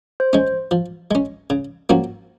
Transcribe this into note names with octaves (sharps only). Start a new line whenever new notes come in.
C5
G#3 C#4
F3
G#3 C#4
C#3
F3 A#3 C#4 F#4